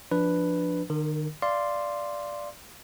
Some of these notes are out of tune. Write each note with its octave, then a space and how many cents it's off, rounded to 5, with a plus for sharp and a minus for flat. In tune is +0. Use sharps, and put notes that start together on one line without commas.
F3 +5 D4 +0 B4 +0
D#3 -40 A#4 +0
D5 +0 F5 -20 C6 +0